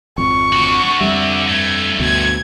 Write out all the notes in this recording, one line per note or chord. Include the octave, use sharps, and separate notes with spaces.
G#1 F2 C#6
D3 F#4
F2 G3 E5
G2 A3 G#6
D2 B2 G#6